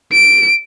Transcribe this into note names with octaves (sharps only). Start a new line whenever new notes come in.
D7